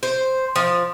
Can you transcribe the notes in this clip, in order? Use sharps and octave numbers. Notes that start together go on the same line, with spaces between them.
C5
F3